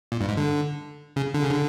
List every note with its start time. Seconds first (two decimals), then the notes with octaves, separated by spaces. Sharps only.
0.12 A#2
0.21 G2
0.28 G#2
0.37 D3
1.16 C#3
1.34 D3
1.43 C#3
1.50 D3